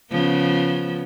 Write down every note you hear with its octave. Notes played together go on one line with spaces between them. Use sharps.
C#3 F3 B3